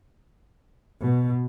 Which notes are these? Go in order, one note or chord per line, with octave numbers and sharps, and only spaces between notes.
B2